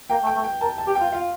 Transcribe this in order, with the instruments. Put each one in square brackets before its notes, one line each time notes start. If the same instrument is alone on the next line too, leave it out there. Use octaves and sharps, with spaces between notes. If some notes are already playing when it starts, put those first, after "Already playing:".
[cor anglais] A#3 [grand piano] G5
[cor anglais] A3
[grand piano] G5
[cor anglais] A3
[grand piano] G5
[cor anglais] A#4 [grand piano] A5
[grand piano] A5
[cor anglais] G4
[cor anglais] F4 [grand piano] G5
[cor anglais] F4 [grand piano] F5